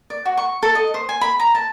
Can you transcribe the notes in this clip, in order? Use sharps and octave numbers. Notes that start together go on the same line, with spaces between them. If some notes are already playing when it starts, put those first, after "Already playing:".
D5
F#4
C#6
A4
D#5
C5
G#5
B5
A#5
A5